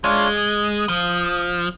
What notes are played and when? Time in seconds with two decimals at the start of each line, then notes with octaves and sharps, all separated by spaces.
0.04 G#3 D4 F4 C#5
0.37 D#6
0.89 F3